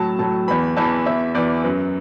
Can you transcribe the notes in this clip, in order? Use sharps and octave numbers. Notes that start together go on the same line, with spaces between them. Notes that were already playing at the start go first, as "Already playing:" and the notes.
Already playing: A2 F#3 A5
A2 F#3 A5
E2 E3 B5
E2 E3 A5
E2 E3 E5
E2 E3 D5
F#2 F#3 B4